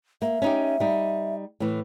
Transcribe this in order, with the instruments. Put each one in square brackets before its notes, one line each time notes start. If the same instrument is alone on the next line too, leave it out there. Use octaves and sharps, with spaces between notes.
[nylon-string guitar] A#3 [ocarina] E5
[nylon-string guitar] C#4 D#4 G4
G3 D#4
A2 E3